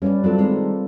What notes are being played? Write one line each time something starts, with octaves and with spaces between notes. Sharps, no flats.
G3 C#4 B4 D5
F#3 G3 C4 D4 F4 A4
D#3 G#3 C4